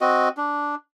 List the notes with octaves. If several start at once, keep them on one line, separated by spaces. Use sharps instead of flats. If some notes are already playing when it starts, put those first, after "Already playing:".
C4 F#4 D#5
D4